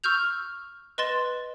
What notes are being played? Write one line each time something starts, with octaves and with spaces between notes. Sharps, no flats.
C#6 E6 F6 G6 F7
B4 D#5 C6 A6 E7